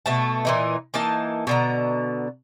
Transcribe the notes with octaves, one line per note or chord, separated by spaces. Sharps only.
B2 A3 A5
A#2 E3 D#4
E3 A#3 D#4 A5
B2 D3 A#5